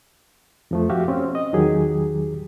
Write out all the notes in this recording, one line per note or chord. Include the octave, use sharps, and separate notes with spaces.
F2 F3 A3
F#4 G4 E5 F5
C4 C#4
D#5
E2 D#3 F#3 G4 G#4